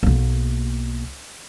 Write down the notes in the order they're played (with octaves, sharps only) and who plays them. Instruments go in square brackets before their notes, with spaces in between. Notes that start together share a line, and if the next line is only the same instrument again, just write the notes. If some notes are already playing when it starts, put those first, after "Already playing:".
[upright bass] B1 A#3